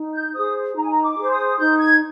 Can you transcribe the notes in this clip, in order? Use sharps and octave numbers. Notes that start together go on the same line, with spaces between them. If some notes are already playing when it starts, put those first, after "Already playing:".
Already playing: D#4
G6
G#4 C5 D#6
D#4 A#5
G#5
A#5
D6
G#4 C5
D#6
D#4 G6
G#6